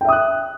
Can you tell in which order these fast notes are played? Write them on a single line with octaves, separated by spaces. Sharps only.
G5 E5 D#6 F#6